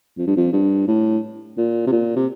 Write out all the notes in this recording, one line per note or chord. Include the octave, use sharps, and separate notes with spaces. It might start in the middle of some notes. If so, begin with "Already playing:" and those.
F2
G2
F2
G2
A2
A#2
C3
A#2
C3